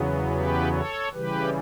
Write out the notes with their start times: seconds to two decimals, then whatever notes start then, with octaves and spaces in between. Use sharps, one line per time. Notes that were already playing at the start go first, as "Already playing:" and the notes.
Already playing: E2 C#3 F#3 B3
0.32 G4 B4
0.72 A4 C#5
1.13 C#3 E3 G3 G4 B4